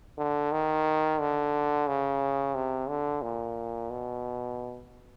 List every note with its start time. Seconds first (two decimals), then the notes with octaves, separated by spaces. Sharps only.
0.18 D3
0.52 D#3
1.20 D3
1.87 C#3
2.55 C3
2.89 D3
3.22 A#2
3.90 B2